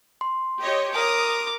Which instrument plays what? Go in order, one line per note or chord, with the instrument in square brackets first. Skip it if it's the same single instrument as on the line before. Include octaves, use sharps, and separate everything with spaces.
[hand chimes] C6
[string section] G4 C#5 D#5
[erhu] A#4 [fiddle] D6 [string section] D#6